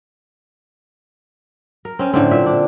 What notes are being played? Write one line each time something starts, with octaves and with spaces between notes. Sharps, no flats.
A#4
C4 C#4
A2 D3 C4
A#2 E5
D4